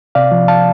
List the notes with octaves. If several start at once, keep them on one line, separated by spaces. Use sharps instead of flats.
C3 D5 F5
F3
F5 A5